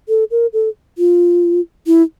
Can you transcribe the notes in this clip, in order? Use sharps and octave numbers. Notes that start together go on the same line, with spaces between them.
A4
A#4
A4
F4
E4